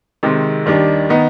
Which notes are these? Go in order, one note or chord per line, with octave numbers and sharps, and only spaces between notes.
C3 D#3 G#3 C4
D#2 D#3 G3 D4
D#3 B3 D#4